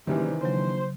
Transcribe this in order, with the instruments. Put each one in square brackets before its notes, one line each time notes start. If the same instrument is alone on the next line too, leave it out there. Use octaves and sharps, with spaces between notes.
[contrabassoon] F#1 [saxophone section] C3 G3 [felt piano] D#3 E3
[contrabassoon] A#1 [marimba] C#3 F#3 [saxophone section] C5